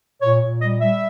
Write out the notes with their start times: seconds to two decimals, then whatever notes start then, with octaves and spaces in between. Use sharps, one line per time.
0.22 A#2 C#5
0.41 A#2
0.61 G3 D#5
0.81 G3 E5